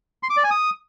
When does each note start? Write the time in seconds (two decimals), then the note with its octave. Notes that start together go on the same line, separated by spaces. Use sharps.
0.23 C6
0.30 D6
0.37 D5
0.44 G#5
0.51 D#6